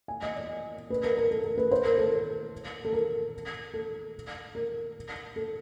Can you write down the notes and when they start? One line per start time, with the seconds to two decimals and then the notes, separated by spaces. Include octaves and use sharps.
0.08 G#5
0.23 D#5
0.36 D5
0.90 B4
1.04 A#4
1.17 A#4
1.31 A4
1.44 A#4
1.58 B4
1.71 C5
1.85 A#4
1.98 A4
2.85 A4
2.93 A#4
3.74 A4
4.55 A#4
5.36 A4